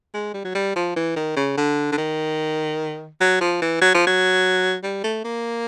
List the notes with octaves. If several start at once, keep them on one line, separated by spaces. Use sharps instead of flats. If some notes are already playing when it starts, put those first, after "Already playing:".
G#3
G3
F#3
G3
F3
E3
D#3
C#3
D3
D3
D#3
F#3
F3
E3
F#3
F3
F#3
G3
A3
A#3